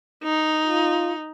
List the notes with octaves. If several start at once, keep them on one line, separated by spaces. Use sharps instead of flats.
D#4
F4